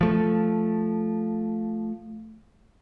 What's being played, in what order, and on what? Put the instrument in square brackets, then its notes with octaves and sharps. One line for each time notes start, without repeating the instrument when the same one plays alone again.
[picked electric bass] F3 A3